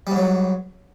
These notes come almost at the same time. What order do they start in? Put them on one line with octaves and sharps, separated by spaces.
G3 G#2 F#3